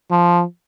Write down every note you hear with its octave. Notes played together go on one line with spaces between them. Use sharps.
F3